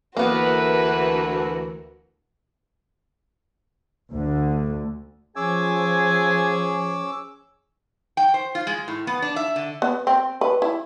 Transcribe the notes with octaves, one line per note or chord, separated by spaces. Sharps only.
D2 E3 A#3 B3 F#4 A#4 B4
D2 D3
F3 C#4 G#4 G#5 D6 E6
G5
C5
F4
G#3
A2
B3
D4
E5
D3
B3
C4
B4
E4